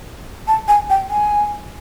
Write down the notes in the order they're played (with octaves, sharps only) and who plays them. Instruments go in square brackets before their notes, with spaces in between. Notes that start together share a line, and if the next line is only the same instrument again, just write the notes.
[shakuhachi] A5
G#5
G5
G#5